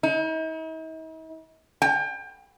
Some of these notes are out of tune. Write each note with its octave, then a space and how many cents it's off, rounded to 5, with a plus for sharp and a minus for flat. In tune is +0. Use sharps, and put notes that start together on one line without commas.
D#4 +45
G5 +30